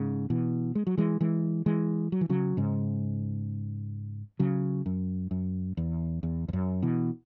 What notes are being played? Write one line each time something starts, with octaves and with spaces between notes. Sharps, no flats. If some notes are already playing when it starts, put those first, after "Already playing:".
Already playing: G#2 C#3
B2 E3
G#3
F#3
E3 G#3
E3 G#3
E3 G#3
F#3
E3
C#3 F#3
G#2 C#3
C#3 F#3
F#2
F#2
E2
E2
E2
F#2
B2 E3